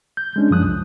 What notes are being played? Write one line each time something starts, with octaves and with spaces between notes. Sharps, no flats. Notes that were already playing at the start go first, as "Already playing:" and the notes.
G6
G#3 C#4 D4
F#2 F3 D#6 F#6
C2